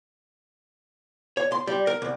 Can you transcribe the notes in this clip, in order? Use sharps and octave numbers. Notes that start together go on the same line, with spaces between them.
C#5
C6
G3
A#4
C2